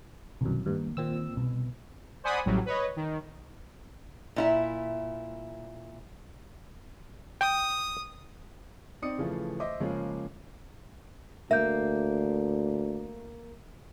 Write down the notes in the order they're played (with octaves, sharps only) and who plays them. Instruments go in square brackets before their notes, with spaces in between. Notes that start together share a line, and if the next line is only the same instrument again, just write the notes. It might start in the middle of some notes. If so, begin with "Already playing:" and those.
[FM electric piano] C2 F#2 [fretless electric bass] B2 D#3
[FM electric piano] G2 [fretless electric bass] D#3 A#3
[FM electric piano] A#2 C4 E6 [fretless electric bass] D#3
[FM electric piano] C2 [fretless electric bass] B2
[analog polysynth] C5 D5 F#5 G#5 B5 D#6
A1 A2 F#3 G3
B4 C#5 D#5
D#3
[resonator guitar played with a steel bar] A#2 E4 E5
[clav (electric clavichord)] G5 [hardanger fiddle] D#6
[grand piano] C4 D#4 D5 D#6 C#7
C#3 E3 F3 A3
C5 D#5 E5 D6
C#3 F3 G#3 A#3 C#4
[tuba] D2 [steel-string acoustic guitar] A#3 [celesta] E5 G6